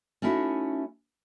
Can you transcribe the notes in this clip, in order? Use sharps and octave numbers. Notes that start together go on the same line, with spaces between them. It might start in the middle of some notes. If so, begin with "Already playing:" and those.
A3 C#4 D#4 E4 F#4